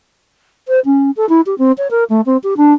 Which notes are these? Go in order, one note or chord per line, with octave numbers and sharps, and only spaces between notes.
C5
C#4
A4
E4
G4
C4
C#5
A#4
A3
C4
G4
D4